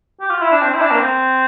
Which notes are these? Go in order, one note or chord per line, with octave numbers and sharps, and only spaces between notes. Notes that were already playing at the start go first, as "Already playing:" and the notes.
G4
F4
E4
D4
C4
E4
D4
A#3
C4